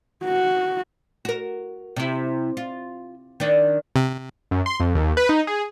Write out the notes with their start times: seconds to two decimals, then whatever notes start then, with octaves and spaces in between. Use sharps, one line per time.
0.24 F#4
1.25 F#4 A#4
1.96 C3 E4
2.57 F4
3.40 D#3 D4
3.96 C3
4.51 F#2
4.66 C6
4.80 F2
4.95 D#2
5.17 B4
5.29 D#4
5.47 G#4